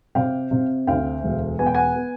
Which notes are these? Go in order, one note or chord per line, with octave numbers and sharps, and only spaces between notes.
C3 F5 G5
C3
D2 F5 G5
E1
B3 G#5
G5
F#5 G#5
B3